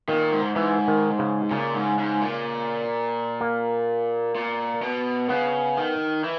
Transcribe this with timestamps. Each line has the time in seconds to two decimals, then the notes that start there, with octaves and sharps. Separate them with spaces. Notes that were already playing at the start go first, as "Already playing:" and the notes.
0.08 A#2 D#3
0.32 G#2
0.56 G#2 E3
0.88 D#3
1.19 C#3
1.51 A#2 C#3
1.74 G#2
1.98 G#2
2.21 A#2
3.41 A#3
4.35 A#2
4.82 B2
5.29 C#3 B3
5.77 D#3
6.24 E3